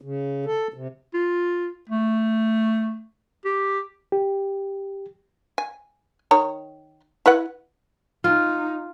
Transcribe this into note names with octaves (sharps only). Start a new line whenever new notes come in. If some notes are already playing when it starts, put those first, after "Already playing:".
C#3
A4
C3
F4
A3
G4
G4
G#5
D#3 C#5 A#5
E4 B4 F#5
D#4 F4